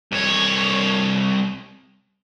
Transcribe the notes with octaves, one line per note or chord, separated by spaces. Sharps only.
C2 C#5